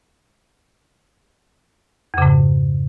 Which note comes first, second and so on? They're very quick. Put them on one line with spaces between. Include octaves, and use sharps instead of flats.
F2 C#3 G#2